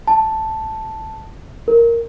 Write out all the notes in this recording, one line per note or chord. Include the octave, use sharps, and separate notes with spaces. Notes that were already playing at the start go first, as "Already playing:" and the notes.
A5
A#4